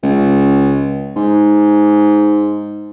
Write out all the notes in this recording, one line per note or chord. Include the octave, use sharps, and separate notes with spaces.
C#2
G#2